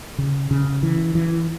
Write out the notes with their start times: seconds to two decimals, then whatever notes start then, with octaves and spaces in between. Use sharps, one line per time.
0.18 C#3
0.51 C#3
0.83 E3
1.15 E3